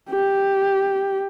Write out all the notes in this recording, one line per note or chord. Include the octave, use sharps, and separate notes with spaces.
G4